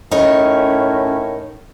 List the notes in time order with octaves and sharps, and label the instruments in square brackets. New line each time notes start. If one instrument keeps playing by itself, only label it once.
[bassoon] A2 [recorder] C#4 [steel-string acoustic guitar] D#4 A#4 C#5